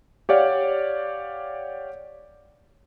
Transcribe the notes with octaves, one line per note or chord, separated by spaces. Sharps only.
G4 C#5 D5 F5 F#5